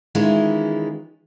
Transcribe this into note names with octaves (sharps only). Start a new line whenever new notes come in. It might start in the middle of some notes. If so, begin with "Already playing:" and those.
D#3 E3 G#3 C#4 E4 F4